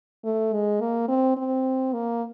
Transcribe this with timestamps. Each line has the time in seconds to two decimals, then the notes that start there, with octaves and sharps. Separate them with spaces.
0.24 A3
0.53 G#3
0.81 A#3
1.08 C4
1.37 C4
1.93 A#3